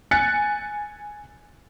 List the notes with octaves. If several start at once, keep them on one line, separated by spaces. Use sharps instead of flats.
G#5 F#6 A6 C#7